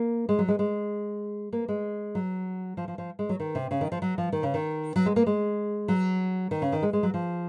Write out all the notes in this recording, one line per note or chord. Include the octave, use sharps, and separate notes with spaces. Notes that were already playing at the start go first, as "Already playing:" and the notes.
Already playing: A#3
G#3
F#3
G#3
G#3
A#3
G#3
F#3
F3
F3
F3
G#3
F#3
D#3
C3
C#3
D#3
F3
F#3
F3
D#3
C#3
D#3
F#3
G#3
A#3
G#3
F#3
D#3
C#3
D#3
G#3
G#3
F#3
F3